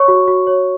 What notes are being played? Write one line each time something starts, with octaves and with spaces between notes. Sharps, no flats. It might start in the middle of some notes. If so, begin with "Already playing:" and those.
Already playing: C#5 C#6
F#4
F#4
C#5